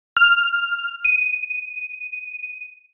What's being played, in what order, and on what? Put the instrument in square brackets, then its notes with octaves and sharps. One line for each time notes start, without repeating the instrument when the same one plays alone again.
[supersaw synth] F6
D#7